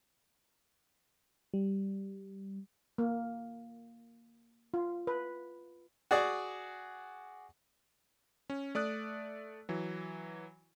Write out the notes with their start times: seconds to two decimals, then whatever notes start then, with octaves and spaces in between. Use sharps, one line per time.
1.54 G3
2.98 A#3
4.74 F4
5.07 B4
6.11 F#4 G#4 D5
8.50 C#4
8.75 A3 D5 D#6 F#6
9.69 E3 F#3